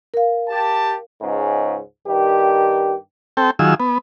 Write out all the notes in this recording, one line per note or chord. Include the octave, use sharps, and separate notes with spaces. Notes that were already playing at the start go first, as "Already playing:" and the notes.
A#4 F5
G4 A5
C#2 G#2 C#4
G2 D#3 G4
C4 A4 G5
D#3 F#3 F4 G#4 E6
B3